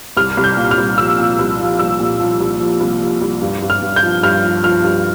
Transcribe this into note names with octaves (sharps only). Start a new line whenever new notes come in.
C2 F6
C2
G6
A#2
F6
C2
F3 E6
A#2
C2
F3
C2 E6
A#2
F3
C2
F3
C2
F3
C2
G2
G2
F6
G2
G6
F3
G2 F6
F3
F3 F6
G2